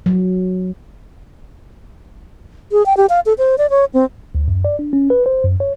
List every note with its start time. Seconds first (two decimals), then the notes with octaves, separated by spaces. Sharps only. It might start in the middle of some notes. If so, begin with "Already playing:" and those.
0.06 F#3
2.72 G#4
2.86 G5
2.97 G4
3.09 F5
3.26 A4
3.38 C5
3.58 D5
3.70 C#5
3.94 C4
4.35 D2
4.48 F#2
4.65 D5
4.79 D4
4.93 C#4
5.10 B4
5.26 C5
5.44 F#2
5.60 C#5